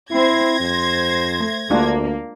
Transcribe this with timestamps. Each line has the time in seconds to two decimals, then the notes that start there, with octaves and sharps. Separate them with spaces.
0.11 C4 E4 C5 G#6 A#6
0.60 F2 C5
1.40 A3
1.70 D2 G#3 A#3 D4 F4